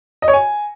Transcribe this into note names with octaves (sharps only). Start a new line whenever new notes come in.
D#5
C#5
G#5